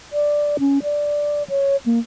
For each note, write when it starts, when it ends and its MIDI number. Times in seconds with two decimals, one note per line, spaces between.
0.13 0.57 74
0.60 0.83 61
0.83 1.43 74
1.49 1.77 73
1.86 1.99 58